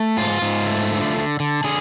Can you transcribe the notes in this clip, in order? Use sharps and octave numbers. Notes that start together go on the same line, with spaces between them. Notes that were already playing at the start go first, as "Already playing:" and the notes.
Already playing: A3
G#2 F4
G#2
A3
D3
D3
D3
D3 G#4